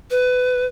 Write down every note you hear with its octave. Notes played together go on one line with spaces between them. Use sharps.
B4